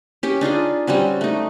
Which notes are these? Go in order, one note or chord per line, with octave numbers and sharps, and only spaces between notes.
C#4 G4
D4 D#4 F4 G#4
G3 C4 C#4 F#4
A3 D#4